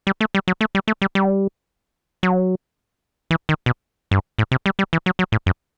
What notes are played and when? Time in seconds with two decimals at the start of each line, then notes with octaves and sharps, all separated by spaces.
0.07 G3
0.21 A3
0.35 G3
0.48 F#3
0.61 A3
0.75 G3
0.88 A3
1.02 G3
1.15 G3
2.23 F#3
3.31 E3
3.49 D#3
3.66 B2
4.11 G2
4.39 A2
4.52 C3
4.66 G3
4.79 G3
4.93 E3
5.06 F#3
5.19 F#3
5.32 A2
5.46 F#2